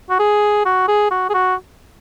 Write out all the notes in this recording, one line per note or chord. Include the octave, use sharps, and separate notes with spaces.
F#4
G#4
F#4
G#4
F#4
G#4
F#4